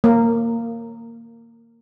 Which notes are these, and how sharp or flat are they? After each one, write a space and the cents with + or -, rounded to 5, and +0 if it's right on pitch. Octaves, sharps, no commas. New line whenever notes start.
A#3 -15